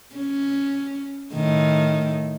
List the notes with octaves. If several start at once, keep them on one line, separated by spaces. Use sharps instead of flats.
C#4
A2 D#3